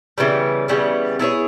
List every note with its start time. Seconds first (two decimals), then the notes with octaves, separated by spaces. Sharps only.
0.18 C#3 E3 G3 B3
0.68 C#3 E3 G3 B3
1.19 B3 E4 G#4 C#5